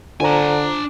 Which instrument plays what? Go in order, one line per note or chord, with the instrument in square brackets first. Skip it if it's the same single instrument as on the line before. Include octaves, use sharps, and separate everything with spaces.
[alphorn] D3 [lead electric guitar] D4 G#5 [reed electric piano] F4 C5 A#5